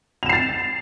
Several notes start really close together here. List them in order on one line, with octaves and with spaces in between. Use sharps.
F7 E7 C7 A6